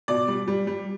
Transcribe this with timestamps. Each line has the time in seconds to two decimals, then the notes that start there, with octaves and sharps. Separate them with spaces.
0.08 B2 D5
0.28 G3
0.48 G3
0.67 G3